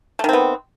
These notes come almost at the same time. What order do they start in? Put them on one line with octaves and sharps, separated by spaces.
A3 D#3 C4 B3